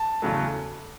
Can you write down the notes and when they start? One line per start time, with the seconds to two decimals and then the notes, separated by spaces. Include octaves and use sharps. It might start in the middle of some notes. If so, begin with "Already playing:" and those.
Already playing: A5
0.22 E2 C#3 F#3 A3